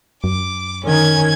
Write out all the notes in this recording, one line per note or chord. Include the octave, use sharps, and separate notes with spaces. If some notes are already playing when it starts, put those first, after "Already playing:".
F#2 D6
D#3 C#4 G#6